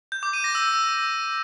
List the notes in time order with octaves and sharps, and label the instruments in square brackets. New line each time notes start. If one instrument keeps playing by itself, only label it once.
[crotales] G6
D6
D#7
A#6
E6